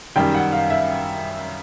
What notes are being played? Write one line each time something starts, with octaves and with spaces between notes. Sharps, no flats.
F#2 D#3 G3 G5
F#5
F5
E5